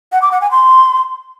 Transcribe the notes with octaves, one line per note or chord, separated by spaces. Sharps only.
F#5
D6
F#5
G#5
C6